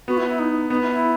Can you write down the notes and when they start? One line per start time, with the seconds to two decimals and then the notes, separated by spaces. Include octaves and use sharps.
0.08 B3 F#4
0.17 E4
0.28 E4
0.39 D#4
0.70 B3 D#4
0.81 E4
0.91 E4